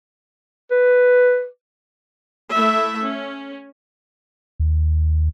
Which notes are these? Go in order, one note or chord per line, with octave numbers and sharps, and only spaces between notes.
B4
A3 E4 E5
C#4
D#2